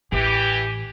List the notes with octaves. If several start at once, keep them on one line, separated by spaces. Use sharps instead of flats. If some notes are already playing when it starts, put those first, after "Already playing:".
A1 E3 G4